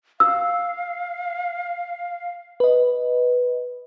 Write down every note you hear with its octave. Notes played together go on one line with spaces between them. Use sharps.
F5 E6
B4 D#5